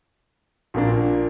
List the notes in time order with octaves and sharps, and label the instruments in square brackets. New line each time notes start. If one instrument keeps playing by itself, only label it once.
[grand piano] A#1 A#2 A#3 D4